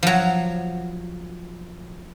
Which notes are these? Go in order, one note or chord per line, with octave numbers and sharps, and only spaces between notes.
F3 F#3